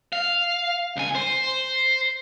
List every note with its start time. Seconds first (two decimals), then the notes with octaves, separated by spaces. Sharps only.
0.13 F5
0.97 C#2 G#5
1.15 C5